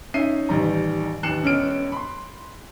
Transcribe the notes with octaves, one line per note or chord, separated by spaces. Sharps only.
C#4 D#4 E5 C7 D#7
A1 D#3 G3 A#5
A1 D#2 F#6 C7 C#7 E7
E1 E2 C#4 D#5 F6 D7
B5 C6